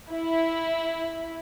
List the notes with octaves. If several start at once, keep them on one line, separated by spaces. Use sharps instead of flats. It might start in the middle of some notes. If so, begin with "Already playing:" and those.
E4